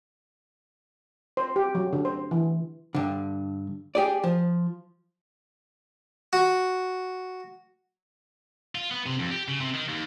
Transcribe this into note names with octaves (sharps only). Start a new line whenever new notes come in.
C5
G4
F#3
D3
C5
E3
G2 D3
G4 G#4 D5
F3
F#4
F4
B3
C3
F2
G4
C#3
C3
D#3
D#2